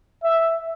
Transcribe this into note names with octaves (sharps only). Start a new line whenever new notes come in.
E5